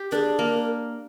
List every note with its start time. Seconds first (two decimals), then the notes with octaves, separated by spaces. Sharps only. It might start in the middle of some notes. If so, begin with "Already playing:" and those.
Already playing: G4
0.11 D4 G#4 A#4
0.39 A#3 A#4